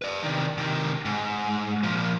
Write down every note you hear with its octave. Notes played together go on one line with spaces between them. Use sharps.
B4 D5
C3 D#3
C3 D#3
G#2
A#2 F3